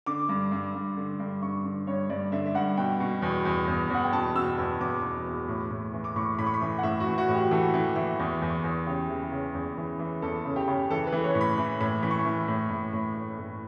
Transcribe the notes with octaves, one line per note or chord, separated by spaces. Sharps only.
D3 D6
G2
G2
G2
D3
G2
G2 C#6
D3
G2 C#5
G2 D5
D3 E5
E5
G2 F#5
B2 G5
B2
E2
E2
E2
E2 F#5
G5
B2 A5
B2 E6
E2 E6
E2 D6
B2
E2
A2
A2
E3
D6
A2 C#6
A2 B5
C#6
B5
E3
F#5
A2 E5
F#4
E3
F#4
A2
G4
E3 A4
E3
E3
E2
E2
E2
C#3 G4
E3
C#3
E2
E3
E3
E2 A4
C#3
G4
C#3
E3 A4
B4
E3
C#5
A2
B5
E3
A2 B5
E3 B5
C#6
B5
E3
A2
A2
A2
A2
A2